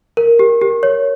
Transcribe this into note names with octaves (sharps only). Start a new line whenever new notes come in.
A#4
G4
G4
C#5